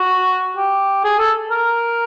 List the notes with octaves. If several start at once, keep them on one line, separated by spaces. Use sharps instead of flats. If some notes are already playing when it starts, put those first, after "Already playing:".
Already playing: F#4
G4
G#4
A4
A#4